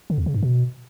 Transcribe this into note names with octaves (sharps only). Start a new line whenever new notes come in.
D3
E2
C#3
G2
B2